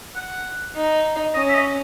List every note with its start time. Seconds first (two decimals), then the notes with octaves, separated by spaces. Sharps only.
0.16 F#5
0.75 D#4
1.35 C#4 D#5
1.49 E5
1.55 D#5